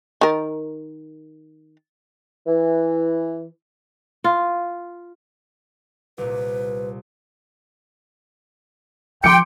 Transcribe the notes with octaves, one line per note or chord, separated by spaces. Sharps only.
D#3 A#4
E3
F4
C2 A#2 B4
F3 G5 C6 D6 C#7